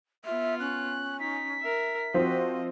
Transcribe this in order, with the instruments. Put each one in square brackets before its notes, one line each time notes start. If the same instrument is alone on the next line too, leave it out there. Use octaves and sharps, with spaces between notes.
[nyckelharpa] B3 F4 [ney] E5
[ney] C#4 [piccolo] F#6
[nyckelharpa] D#4 [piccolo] B6
[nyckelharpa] A#4 E5
[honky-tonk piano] F3 C4 [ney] F#4 [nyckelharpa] D#5